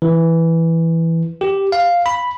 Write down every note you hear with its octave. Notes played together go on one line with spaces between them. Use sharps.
E3
G4
F5
B5